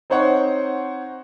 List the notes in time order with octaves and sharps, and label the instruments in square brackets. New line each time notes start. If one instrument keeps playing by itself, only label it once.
[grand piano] C4 D#4 C5 C#5 F#5